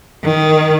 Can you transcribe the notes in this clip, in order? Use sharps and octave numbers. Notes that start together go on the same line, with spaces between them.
D#3